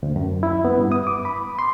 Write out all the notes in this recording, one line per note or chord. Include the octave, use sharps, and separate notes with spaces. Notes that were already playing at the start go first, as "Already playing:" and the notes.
D2
F#2
E4
B3
G2
D#6
D6
B5
C6